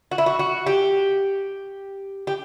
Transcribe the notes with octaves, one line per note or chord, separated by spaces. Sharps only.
F#4
E4
F#4
F#4
G4
G4